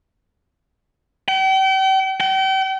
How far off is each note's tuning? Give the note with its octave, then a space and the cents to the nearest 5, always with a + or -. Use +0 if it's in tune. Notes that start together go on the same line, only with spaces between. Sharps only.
G5 -40
G5 -40